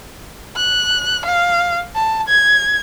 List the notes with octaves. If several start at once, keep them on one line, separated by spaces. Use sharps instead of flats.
F#6
F5
A5
G#6